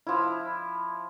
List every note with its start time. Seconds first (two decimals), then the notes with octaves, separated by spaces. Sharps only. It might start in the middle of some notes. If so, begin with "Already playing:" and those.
0.07 F3 E4